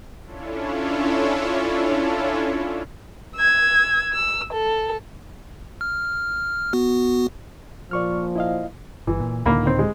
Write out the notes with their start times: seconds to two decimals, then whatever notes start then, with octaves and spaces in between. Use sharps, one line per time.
0.24 C#4 D4 E4 F4 A4 C#5
3.36 E6 G#6
4.14 E6
4.53 A4
5.81 F6
6.73 B3 F#4
7.91 A#2 F3 D5 C#6 F6
8.36 E4 D#5 F5
9.07 G1 E3
9.20 A#2
9.46 C#2 A2 D3 D#3 A#3 B5
9.66 D#3 C4
9.79 G#3